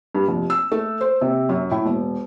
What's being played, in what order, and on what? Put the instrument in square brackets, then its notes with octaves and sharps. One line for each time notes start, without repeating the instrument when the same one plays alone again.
[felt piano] G2
F1
E6
A3
C5
C3
F#2
A2
E1